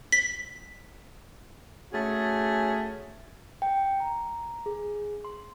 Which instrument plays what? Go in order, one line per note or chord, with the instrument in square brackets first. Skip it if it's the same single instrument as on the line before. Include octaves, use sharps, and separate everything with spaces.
[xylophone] B6
[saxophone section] A3 C#4 F#4 G#4
[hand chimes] G5
A#5
G#4
C6